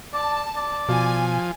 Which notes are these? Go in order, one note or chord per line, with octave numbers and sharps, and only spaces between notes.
D5 A5
D5
B2 F3 G#5